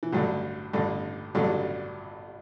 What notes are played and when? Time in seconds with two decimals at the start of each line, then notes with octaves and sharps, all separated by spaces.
0.03 E3
0.12 A1 G2 D3 F#3
0.74 A1 G2 D3
1.35 A1 G2 D3 F#3
1.44 G3